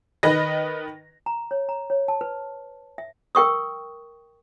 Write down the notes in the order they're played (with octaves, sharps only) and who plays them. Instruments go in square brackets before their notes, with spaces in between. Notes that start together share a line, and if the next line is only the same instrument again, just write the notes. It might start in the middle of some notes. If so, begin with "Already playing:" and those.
[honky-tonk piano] D#3 B4 D#5 A#6
[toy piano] A#5
C#5
A#5
C#5
A5
B4
E5
A#4 G5 C#6 D#6